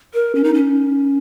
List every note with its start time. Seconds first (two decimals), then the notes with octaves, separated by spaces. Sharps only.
0.14 A#4
0.35 C#4
0.44 D#4
0.54 C#4